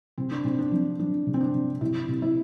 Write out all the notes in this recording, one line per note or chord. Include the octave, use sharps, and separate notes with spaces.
C3 C4
D4
C3 C4
D4
F3 C4
F3 D4
C3
C4
D4
C3
C3 E4
C3
E4